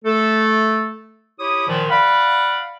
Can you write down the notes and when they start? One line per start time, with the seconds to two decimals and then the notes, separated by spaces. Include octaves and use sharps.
0.05 A3 A4
1.40 E4 G4 C#5 D#6
1.68 A#2 D#3 F3
1.90 D5 F5 F#5 B5